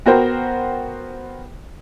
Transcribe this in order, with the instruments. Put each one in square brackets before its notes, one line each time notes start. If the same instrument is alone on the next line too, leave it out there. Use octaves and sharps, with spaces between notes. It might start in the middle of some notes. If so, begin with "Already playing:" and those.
[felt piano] B3 F#4 A#4 C5 G5